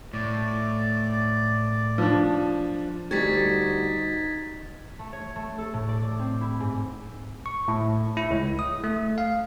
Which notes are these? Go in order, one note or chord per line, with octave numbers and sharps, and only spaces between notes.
A2 D5
F3 D4
D2 G3 D#4 F#4 G#6 A6 B6
A3
C#5
A3
A4
A2
D5
D6
C4
E4
G#2
C#6
A2
E4
C#2
D#6
A3
F5